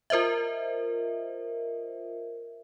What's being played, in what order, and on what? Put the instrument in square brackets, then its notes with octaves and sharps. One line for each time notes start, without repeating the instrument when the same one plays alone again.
[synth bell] F4 A#4 C5 D#5 E5